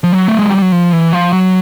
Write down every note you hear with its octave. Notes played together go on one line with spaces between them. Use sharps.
F3
F#3
A3
G#3
G3
F#3
F3
E3
F3
F#3